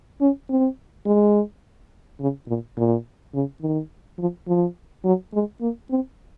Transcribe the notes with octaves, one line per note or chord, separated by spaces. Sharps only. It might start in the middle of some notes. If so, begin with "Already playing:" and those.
C#4
C4
G#3
C#3
A#2
A#2
C#3
D#3
F3
F3
F#3
G#3
A#3
C4